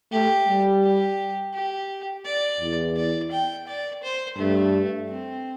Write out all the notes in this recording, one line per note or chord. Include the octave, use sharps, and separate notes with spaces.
A3 G4
G3
G4
G4
D5
E2
D5
G5
D5
C5
G2 A3
C4